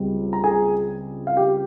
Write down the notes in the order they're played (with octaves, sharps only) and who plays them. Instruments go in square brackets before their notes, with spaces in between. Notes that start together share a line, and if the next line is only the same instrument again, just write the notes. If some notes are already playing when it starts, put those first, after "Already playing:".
Already playing: [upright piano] C#2 C#3 G3 C4
[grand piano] A#5
G#4 G#5
F5
G4 G5